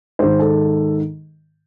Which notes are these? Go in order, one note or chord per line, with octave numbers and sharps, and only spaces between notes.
G#2 D#3 C5
A4